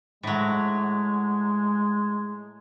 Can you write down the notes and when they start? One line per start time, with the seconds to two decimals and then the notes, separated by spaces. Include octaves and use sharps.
0.23 A2 F#3 G#3